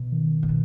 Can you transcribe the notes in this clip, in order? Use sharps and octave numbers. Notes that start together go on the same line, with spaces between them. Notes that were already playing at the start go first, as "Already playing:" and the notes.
Already playing: B2
D#3
A#2
B2